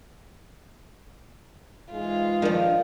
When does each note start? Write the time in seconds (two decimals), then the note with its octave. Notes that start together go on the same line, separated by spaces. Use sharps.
1.92 G#2 E3 G#3 F4
2.42 D#3 F3 D4 A#4 D#5